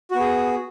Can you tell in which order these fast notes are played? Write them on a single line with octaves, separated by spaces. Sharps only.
F#4 B3 G#4